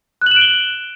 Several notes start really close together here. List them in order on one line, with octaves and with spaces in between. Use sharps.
F#6 F#7 E7 D7 G7